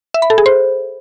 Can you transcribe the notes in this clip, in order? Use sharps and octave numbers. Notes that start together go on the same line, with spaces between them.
E5
B5
A4
G#4
C5